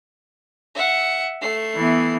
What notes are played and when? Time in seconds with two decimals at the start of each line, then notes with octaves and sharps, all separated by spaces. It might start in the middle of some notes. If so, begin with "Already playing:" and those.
0.75 E5 F#5
1.41 A3 C7
1.76 E3 B3